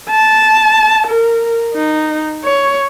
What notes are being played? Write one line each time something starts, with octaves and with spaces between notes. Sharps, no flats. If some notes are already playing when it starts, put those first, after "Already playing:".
A5
A#4
D#4
C#5